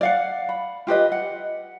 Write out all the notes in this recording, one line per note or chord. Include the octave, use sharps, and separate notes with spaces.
D5 F5 F#5
B5
F4 G4 B4 D#5
F#5